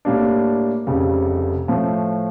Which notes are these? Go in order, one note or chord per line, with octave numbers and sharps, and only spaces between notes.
A2 G3 A#3 D4
F1 F2 C#3 G3
A2 F3 A3